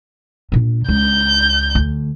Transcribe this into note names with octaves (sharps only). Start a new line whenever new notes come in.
A#2 D4
C#2 G6
D2